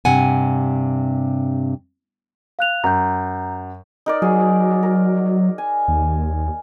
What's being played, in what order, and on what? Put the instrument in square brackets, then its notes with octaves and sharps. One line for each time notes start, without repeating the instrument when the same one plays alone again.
[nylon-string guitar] G2 C3 F#5 G#5
[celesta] F5 F#6 F7
[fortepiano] F#2 [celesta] A#5 G6
[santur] D#4 A#4 D5
[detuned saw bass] F#3 [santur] G#4
[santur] A#4
G#5
[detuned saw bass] D#2